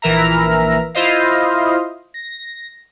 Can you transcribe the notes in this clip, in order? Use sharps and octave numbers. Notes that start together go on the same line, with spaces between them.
A#1 E3 A#4 E5 A#5
E4 F4 C5 D#5 F5
A#6